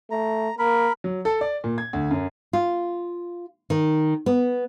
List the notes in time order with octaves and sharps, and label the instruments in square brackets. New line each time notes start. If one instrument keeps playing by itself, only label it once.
[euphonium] A3 [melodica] A#5
[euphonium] A#3 [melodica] A#4 B5
[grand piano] F#3
A4
D5
A#2
G#6
D2
F#2
[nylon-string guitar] F4
D#3
B3